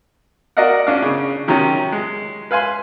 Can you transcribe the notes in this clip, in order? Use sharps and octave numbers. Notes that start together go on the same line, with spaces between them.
F#4 A#4 D5 D#5 F5 F#5
C#4 D4 F5
C#3
C3 D#3 F#3 C#4
G#3
B4 F5 G#5 C6